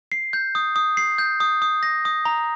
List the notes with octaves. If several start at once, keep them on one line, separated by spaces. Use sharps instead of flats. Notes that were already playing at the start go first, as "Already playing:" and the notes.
C7
G6
D#6
D#6
C7
G6
D#6
D#6
A#6
D#6
A#5